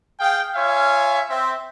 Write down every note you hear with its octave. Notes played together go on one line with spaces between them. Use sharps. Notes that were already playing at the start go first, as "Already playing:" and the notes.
G#4 F5 G5
F4 C#5 E5 F5 G#5
C4 E5